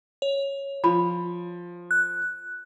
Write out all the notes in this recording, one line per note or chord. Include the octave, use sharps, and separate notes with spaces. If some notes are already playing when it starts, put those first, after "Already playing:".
C#5
F3 B5
F#6